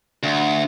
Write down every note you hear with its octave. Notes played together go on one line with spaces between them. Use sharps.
D2